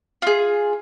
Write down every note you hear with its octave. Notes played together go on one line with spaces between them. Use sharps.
F4 G#4